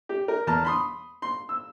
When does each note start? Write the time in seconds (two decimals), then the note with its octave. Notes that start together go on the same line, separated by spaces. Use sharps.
0.09 G4
0.28 A#4
0.47 E2 A5 A#5 F6
0.65 B5 C6 D#6
1.22 C6
1.49 E6